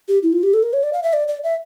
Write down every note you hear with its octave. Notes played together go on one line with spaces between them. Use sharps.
G4
E4
F4
G4
A4
A#4
C#5
D5
F5
E5
D5
D5
E5